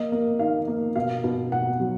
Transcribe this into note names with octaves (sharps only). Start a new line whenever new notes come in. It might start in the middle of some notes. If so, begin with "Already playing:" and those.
Already playing: A#3 D#5
A#3
D#3 F5
A#3
B2 F5
B2
B2 F#5
F#3